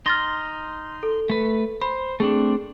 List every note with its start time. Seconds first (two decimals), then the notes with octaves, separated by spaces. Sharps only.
0.06 D#4 C6 F6 A6 A#6
1.03 A4
1.30 A3 B4
1.81 C5 B5
2.20 A3 C4 D4 G#4